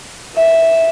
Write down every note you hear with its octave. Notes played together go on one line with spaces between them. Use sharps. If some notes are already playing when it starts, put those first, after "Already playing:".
E5